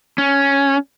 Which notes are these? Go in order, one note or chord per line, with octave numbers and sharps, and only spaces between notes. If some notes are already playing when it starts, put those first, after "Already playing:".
C#4